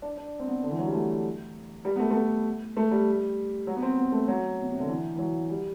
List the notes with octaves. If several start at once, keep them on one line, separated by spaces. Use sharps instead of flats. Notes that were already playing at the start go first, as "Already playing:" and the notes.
D4
D4
C4
B3
D3
E3
F#3
G3
A3
G3
B3
A3
A3
B3
A3
G3
F#3
B3
C4
B3
A3
F#3
B2
C3
D3
E3
E3
F#3
G3